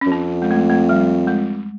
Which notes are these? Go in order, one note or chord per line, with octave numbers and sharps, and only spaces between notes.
F#2 C#4
F2 C4
G#3
A3
A3
G3
G#3